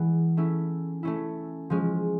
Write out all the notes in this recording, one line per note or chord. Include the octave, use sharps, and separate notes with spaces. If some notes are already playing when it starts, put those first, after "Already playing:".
Already playing: E3 G#3 B3 E4 G#4
A3 C#4 E4
A3 C#4 E4
F3 G#3 C#4